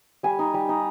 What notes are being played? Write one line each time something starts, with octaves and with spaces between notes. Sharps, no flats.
G3 G#5
D#4
G3
D#4